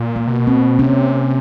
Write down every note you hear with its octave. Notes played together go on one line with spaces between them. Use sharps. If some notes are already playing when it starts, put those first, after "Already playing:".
Already playing: A#2
A#3
C3
B2
C4
C3 C#4